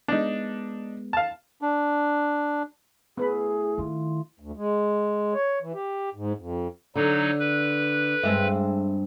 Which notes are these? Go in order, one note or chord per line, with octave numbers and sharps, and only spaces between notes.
G#3 B3 D4 D#4
F5 A5
D4
A2 B3 G#4 B4 B5
D#3 F4
D2
G#3
C#5
E3
G4
G#2
F2
D3 F#3 D#4
B4
G2 G#3 C4 E5